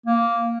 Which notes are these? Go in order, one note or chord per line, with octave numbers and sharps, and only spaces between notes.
A#3